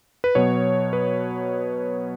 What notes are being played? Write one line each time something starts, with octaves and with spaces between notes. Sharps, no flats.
B4
B2 F#3 B3 C#5
B4